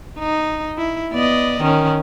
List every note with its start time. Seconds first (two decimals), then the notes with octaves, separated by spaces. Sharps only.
0.19 D#4
0.77 E4
1.12 B3 D5 D#5
1.61 D#3 C#4